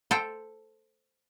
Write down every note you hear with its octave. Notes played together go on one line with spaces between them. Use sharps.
A4 C5 G5